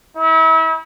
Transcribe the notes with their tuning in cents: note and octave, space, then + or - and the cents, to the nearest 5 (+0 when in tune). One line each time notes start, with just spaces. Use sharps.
E4 -35